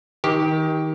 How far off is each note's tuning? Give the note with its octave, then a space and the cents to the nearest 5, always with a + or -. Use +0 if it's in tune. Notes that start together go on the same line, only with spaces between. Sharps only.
D#3 +25 G4 +0